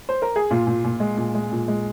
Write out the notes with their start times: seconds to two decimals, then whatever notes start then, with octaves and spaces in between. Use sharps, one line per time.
0.09 C5
0.22 A#4
0.36 G#4
0.51 A#2 F4
0.67 A#2
0.84 A#2
1.00 G#3
1.17 A#2
1.35 G#3
1.52 A#2
1.68 G#3